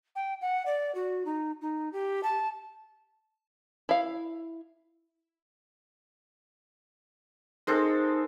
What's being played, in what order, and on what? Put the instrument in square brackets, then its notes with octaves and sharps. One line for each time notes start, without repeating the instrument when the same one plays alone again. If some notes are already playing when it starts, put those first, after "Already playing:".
[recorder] G5
F#5
D5
F#4
D#4
D#4
G4
A5
[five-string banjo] E4 F5
[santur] G#3 C4 A4 [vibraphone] D#4 A#4 C5